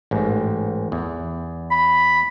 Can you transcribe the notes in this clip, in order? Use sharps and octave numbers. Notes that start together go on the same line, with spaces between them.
A1 G#2
E2
B5